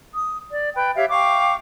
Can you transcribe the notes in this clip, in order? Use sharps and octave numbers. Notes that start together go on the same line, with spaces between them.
D#6
D5
B4 G5
G4 C#5 E5 F5
F5 G5 C#6 D6